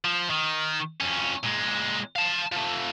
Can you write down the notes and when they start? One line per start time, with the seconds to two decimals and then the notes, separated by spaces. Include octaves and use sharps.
0.04 F3
0.30 D#3
1.00 F2 C#4
1.44 A#2 G#3
2.16 F5 A5
2.52 F3 A3